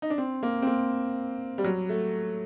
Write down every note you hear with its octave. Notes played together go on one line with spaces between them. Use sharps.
D#4
D4
C4
A#3
C4
A#3
G3
F#3
A3